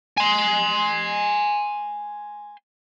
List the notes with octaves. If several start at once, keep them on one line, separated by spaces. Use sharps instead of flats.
G#5 C6